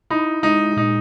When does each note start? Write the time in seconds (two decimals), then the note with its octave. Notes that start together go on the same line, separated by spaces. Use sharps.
0.10 D#4 E4
0.43 G#3 D#4
0.77 A#2 D#4